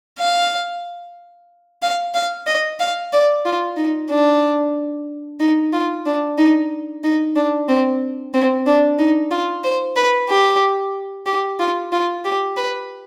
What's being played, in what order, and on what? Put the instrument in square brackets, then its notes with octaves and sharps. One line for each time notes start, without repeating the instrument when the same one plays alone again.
[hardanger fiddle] F5
F5
F5
D#5
F5
D5
F4
D#4
D4
D#4
F4
D4
D#4
D#4
D4
C4
C4
D4
D#4
F4
C5
B4
G4
G4
F4
F4
G4
B4